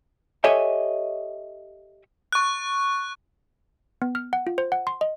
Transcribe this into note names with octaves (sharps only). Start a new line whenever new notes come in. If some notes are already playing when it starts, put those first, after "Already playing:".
G4 A4 C#5 D#5 E5 G#5
C#6 F#6
B3
F6
F#5
F4
C5
F#5
C6
D#5